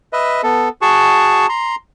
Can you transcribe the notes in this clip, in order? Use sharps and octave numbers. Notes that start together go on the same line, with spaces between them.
B4 D#5 E5
B3 A4
F#4 G#4 A5 C#6
A#5 C6